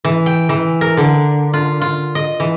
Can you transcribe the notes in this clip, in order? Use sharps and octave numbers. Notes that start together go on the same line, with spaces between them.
E3
G5
E3
A#4
D3
F4
F4
D#5
E3